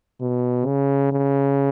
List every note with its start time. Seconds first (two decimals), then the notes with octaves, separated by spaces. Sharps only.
0.21 B2
0.66 C#3
1.12 C#3